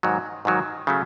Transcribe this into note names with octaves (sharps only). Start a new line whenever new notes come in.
G#2 D#3 F#3
G#2 D#3 F#3
C#3 F#3 A3